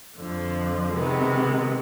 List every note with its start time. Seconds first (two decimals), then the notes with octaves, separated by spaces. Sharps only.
0.19 F2 D3 F3
0.93 C3 D#3 G#3 B3